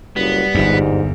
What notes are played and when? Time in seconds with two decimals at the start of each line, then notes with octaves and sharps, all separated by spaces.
0.16 F#1 G3 B3
0.55 G1 E2 G#2